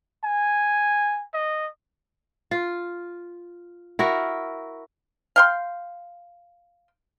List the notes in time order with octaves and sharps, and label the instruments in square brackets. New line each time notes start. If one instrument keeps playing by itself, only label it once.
[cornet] G#5
D#5
[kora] F4
E4 F#4 A#4
[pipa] F5 G5 C6